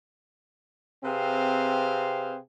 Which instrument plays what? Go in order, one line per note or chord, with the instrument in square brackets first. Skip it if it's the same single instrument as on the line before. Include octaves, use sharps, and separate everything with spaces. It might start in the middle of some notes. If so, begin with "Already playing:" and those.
[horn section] C3 C4 G#4 B4 C5 F5